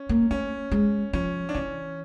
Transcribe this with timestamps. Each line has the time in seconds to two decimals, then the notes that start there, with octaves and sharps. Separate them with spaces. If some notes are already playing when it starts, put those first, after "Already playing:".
Already playing: C#4
0.09 A#3
0.31 A3 C#4
0.72 G#3
1.13 F3 C#4
1.49 D4
1.55 E3 C#4